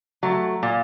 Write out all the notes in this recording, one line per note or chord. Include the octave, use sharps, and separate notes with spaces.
F#3 A3
A#2